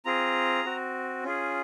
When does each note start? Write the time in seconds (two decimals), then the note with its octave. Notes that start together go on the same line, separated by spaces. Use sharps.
0.05 C4 F4 G#4 A#5
0.65 C4 F#4
1.24 C#4 F4 G#4